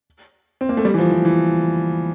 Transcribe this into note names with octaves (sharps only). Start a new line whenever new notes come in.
C4
A#3
A3
G3
E3
F3
E3
E3